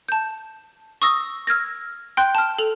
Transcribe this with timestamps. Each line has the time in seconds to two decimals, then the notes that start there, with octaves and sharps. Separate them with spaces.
0.09 A5 G6
1.02 C#6 D#6 E6 A#6
1.47 E6 F6 G#6 A#6
2.17 G5 C6 F#6 G6
2.35 A5 F6
2.59 A4 F7